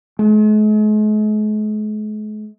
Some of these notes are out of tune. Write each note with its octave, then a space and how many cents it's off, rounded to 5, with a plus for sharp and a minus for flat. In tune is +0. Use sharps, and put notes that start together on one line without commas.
G#3 +45